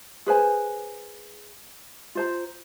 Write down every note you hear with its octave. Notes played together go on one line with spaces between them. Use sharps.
G#4 B4 C5 G#5
F4 C5 A#5